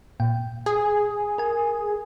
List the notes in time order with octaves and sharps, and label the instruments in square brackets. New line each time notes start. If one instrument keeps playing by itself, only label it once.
[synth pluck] A#2 G5
[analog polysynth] G#4
[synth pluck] A#4 G#5